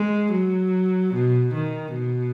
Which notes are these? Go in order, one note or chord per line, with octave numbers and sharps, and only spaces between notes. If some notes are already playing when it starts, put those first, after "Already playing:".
Already playing: G#3
F#3
B2
D#3
B2